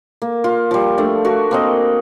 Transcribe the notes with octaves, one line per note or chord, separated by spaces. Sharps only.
A#3
F4
F3 G3
A3 D4
F#4 A#4
A#3 C4 D#5